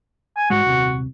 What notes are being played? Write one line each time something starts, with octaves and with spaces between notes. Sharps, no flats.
G#5
G#2 G#3 F#4
D#1 C2 C3